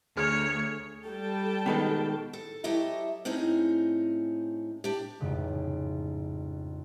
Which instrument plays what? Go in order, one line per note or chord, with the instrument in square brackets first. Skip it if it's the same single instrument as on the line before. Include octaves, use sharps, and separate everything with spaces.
[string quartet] D2 [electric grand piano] G#4 F6 [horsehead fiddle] C#5
[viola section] G3 G5 A5 [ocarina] A4
[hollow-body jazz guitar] B2 D#3 G#3
[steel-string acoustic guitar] A4
F#3 E4 G4 A4 D#5 E5
A2 C4 C#4 D#4 G#4 D#5
D4 G4
[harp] A1 F2 G#2 C#3